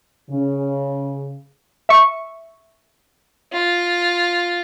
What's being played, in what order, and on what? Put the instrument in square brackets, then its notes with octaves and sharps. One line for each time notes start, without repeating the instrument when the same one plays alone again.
[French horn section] C#3
[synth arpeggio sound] E5 C#6
[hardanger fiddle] F4